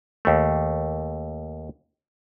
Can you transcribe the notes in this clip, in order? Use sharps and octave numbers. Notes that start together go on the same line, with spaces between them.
D#2 A3